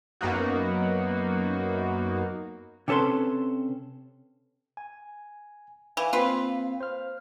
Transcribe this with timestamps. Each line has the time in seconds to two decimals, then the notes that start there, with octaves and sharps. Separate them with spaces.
0.21 F#2 A#3 B3 D#4 F#4
2.88 C3 C#4 A4 B4 C6
4.77 G#5
5.97 E3 F5
6.13 A#3 C4 F4 B4
6.80 C5 F6